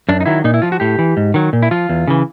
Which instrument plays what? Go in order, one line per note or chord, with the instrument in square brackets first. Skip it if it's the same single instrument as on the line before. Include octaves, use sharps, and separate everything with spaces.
[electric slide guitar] F#2 D4
D#4
D#3 F#3 E4
A#2 D#4
E4
F3 F4
F#4
A2 G4
E3
G#2
D#3 F#3
A#2
E4
F3 F4
E2
C#3 E3